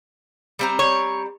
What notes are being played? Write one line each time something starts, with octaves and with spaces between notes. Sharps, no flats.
G3 C4 A#5
C#5